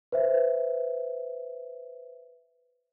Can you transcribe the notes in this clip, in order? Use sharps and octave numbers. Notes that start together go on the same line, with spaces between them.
B4 C5 E5